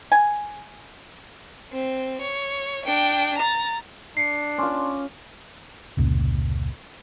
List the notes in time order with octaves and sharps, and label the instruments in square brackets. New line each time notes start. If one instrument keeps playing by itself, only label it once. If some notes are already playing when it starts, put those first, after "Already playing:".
[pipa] G#5
[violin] C4
C#5
D4 G5
A#5 A6
[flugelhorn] D4 [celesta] C7 C#7
[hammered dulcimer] C#4 F4 [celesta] C6 D6
[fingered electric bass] F1 C#2 A#2